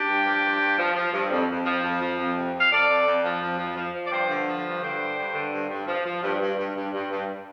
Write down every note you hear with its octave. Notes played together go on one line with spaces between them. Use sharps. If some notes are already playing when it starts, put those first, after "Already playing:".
Already playing: D4 G4
G2
F3
G2
G2
F3
F3
G2
F2
F2
F3
F2
F3
F2
C3
F2
F5
F2 A4 D5
F2
F2
F3
F2
F3
F3
F3
D5
G2 G4 C5
D3
F3
G2
D3 G4 C5
G2
G2
D3
G2
G2
F3
F3
G2
G2
G2
G2
G2
G2